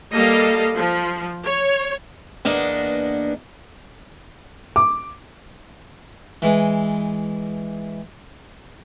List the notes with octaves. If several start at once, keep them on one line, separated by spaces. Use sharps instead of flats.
G3 A#3 A4 D#5 F5
F3
C#5
E2 A#3 B3 D4 D#5
D6
E3 G#3